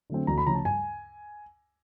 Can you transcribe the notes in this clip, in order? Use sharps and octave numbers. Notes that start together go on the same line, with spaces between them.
D3 F#3 A3 C4
D2 A#5
B5
C#3 F3 A3 C#4 A#5
A5
G2 G#5